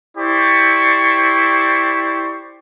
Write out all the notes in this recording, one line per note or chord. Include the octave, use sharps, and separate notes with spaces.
E4 G4 C5 D5 C#6